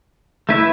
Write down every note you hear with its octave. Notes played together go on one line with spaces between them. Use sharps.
A3 E4 B4 E5